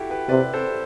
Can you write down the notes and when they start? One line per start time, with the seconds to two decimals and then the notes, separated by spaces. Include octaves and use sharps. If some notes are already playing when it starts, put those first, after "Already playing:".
Already playing: E4 F#4 G4 A4
0.10 G4 B4
0.29 C3 B4 D5
0.54 A4 C5